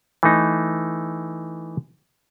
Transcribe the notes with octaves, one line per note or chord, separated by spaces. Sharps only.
E3 A3 D#4